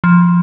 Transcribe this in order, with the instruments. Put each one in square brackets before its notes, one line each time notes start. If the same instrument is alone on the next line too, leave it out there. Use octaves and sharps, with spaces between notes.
[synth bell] F3